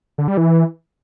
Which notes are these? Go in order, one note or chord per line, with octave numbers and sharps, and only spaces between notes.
D3
G3
E3